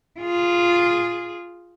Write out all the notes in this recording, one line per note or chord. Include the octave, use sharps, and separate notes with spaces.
F4 G#4